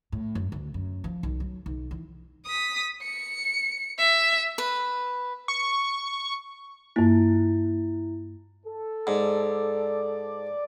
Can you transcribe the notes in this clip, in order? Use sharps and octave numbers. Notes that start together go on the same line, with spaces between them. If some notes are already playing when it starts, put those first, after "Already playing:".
A2
F#2
D2
F#2
F3
B1
F#3
B1
E3
D#6 B6
C#7
E5
B4
C#6
G2 A#3 E4
A4
G#2 D5